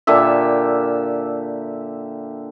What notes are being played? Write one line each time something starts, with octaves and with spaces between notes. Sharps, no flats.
A#2 D3 G4 E5